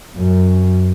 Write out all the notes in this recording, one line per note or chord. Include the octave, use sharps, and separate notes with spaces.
F#2